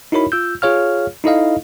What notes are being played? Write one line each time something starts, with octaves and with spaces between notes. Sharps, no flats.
D#4 E4 F#4 A#4 C#5 B5
F4 E6 G6
F4 G#4 C#5 F5 F6
D#4 E4 A4 D#5 F5